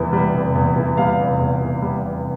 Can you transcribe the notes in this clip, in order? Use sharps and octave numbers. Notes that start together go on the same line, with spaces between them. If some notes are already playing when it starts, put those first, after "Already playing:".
Already playing: F1 E2 E3 G3
G3
F1
E2
E3
G3 F5
F1
E2
E3
G3
F1